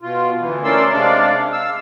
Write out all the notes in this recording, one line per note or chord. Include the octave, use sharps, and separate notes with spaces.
B2 F4
D2 E3
A3 C#4 A#4 D5 C6 E6
C3 G#3 D4 D5 F5
F5 E6